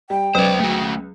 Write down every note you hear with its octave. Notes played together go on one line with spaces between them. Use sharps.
G3 G5
C#2 F#3 B3 B4 C5 D5
A3 F#4